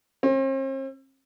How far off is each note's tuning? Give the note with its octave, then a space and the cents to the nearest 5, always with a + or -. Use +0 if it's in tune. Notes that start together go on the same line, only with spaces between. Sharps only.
C4 +45